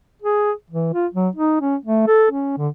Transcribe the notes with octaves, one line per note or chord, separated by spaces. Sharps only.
G#4
E3
F4
F#3
D#4
C#4
A3
A4
C#4
D3